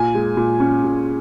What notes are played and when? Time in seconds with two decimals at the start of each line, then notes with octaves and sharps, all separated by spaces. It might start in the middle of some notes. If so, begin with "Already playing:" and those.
Already playing: A#2 G#5
0.15 G#3
0.37 A#2
0.60 C#4
0.84 A#2